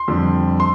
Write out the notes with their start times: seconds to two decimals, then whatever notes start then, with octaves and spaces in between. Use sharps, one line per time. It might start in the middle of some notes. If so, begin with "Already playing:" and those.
Already playing: C6
0.08 F2 D3 G3
0.60 C6